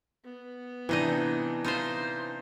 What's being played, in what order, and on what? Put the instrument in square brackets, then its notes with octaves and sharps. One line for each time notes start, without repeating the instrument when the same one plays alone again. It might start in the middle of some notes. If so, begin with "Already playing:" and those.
[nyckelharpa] B3
[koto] C3 D#4 D#5 [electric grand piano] E3 D4
[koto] D#4 F4 C5